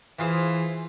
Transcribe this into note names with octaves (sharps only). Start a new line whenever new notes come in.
E3 F4 G#4 C5